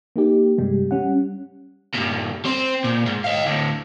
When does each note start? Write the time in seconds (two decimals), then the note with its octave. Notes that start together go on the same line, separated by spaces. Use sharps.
0.16 A#3 D#4 G4
0.58 G2 C3 G3 G#3
0.91 G3 C#4 F#5
1.95 G2 A#2
2.45 C4 C5
2.84 A#2
3.06 G#2
3.24 D#5 F5
3.46 D2 A2